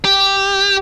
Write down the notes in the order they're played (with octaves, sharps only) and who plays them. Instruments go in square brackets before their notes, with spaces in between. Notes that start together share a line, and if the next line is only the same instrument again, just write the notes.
[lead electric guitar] G4